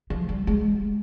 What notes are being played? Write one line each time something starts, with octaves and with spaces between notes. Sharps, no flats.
F3
G3
G#3